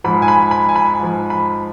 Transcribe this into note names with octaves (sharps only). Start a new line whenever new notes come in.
G#2 F3 B5
G#5
B5
B5
G#5
B5
G#2 F3
B5